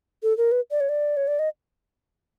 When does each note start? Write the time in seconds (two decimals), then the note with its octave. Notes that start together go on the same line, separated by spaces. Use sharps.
0.23 A4
0.37 A#4
0.52 B4
0.71 D5
0.80 C#5
0.89 D5
1.17 C#5
1.28 D5
1.39 D#5